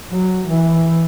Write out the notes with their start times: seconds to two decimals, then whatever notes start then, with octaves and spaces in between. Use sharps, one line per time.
0.11 F#3
0.48 E3